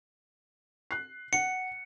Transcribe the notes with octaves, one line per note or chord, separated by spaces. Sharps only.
F#6 C7
F#5 C#7